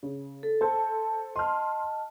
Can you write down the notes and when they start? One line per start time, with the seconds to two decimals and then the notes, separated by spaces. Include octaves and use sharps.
0.03 C#3
0.43 A4
0.61 A4 C5 A5
1.36 D#5 A5 C6 F6